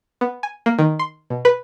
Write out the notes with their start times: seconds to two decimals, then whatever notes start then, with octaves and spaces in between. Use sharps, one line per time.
0.21 B3
0.43 G#5
0.66 A#3
0.79 D#3
0.99 C6
1.30 B2
1.45 B4